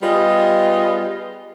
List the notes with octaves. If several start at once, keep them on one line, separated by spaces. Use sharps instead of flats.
G3 B3 F4 G#4 D#5